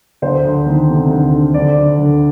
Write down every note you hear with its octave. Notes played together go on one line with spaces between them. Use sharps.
D2 C5
D2
D#3
C3
D2
D2
D2 D5
D3
D2